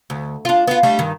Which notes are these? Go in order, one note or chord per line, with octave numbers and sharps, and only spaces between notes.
D2
D4 F4
B3 F4
G3 A3 D4
G2 D#3